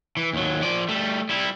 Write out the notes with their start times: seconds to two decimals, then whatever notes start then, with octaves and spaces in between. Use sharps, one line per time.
0.17 E3
0.33 D#2 F#3
0.63 F3 D5
0.89 G3 A3
1.29 G3 E4